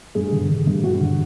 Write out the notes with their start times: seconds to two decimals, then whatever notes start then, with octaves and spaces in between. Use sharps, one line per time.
0.15 G2 G#4
0.32 D3
0.49 D3
0.67 G2
0.84 G2 F#4
1.01 D3